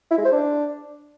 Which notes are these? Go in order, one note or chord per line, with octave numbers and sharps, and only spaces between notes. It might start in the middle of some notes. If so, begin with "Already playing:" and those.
E4
G#3
C5
D4